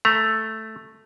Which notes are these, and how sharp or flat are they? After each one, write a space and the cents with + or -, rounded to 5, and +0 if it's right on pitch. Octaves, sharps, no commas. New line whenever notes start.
A3 +0 A#5 +20